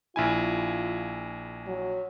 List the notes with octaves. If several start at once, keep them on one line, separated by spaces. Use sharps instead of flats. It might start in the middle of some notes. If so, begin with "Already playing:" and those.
A#1 E4 F4 G#5
F#3